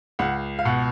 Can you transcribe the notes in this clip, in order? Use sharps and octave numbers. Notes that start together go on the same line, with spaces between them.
C#2 F#5
F5
B2 F#5